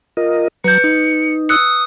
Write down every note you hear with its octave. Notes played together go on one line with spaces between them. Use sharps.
F4 A#4 D#5
F#3 B4 A#5 G6 C#7
D#4
D#6 E6 F#6 C#7